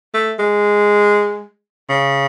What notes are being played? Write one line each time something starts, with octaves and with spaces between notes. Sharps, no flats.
A3
G#3
C#3